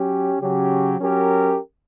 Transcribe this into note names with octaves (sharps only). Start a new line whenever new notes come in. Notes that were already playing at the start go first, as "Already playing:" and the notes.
Already playing: F#3 C#4 G4
C#3 F#3 C#4 G4
F#3 C#4 G4 A#4